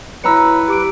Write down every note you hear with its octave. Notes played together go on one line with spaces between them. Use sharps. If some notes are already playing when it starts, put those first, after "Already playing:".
F#3 E4 B4 A#5 E6 C#7
G4 D6 D7